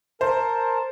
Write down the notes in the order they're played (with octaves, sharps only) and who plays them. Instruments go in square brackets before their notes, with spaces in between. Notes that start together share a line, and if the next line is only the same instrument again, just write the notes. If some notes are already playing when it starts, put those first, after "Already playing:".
[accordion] A#4 A5 [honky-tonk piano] C5